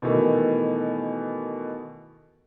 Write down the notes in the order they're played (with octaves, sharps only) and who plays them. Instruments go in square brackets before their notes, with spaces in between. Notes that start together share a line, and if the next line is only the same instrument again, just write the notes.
[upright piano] B2 D#3 E3 A3